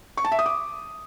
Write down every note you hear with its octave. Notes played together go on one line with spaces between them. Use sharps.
C#6
A5
E5
D#6
D6